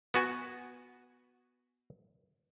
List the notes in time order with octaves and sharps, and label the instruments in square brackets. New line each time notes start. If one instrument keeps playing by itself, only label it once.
[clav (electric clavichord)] B3 F#4 G#5